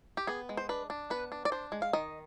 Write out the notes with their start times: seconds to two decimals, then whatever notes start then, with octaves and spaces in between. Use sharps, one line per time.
0.17 G4
0.27 B3 G#4
0.49 G#3
0.57 C5
0.69 D4 B4
0.90 D4
1.10 B3 B4
1.32 D4
1.45 D5
1.52 D4 C5
1.72 G#3
1.82 F5
1.93 D#3 D#5